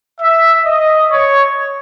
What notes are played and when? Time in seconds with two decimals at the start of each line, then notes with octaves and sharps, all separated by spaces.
0.21 E5
0.66 D#5
1.12 C#5